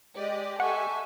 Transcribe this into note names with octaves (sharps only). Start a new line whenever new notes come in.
G#3 G4 D5 D#5
A4 E5 F#5 G#5 C#6